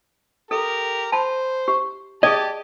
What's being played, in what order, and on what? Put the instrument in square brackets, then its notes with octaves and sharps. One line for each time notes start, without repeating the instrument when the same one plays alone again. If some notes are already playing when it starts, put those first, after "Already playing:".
[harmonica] G4 A#4 [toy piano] A4
[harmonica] C5 [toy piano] A5 B5
[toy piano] G4
[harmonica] G4 A5 [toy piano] G#4 D5 [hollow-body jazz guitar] D#5